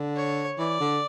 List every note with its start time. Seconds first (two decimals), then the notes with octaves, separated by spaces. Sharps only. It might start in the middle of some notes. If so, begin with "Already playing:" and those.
Already playing: D3
0.16 C#5
0.58 E3 D5
0.80 D3